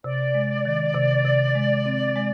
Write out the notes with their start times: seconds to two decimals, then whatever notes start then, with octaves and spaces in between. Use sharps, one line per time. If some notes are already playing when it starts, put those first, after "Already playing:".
0.04 C3 D5
0.35 G#3
0.65 D#3
0.94 C3
1.25 C3
1.55 G#3
1.86 C4
2.16 G#3